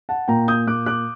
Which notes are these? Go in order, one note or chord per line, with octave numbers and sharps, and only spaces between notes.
F#5 A5
A#2 G5 A#5
D#6 G6
A#2 D6 F#6
D6 F#6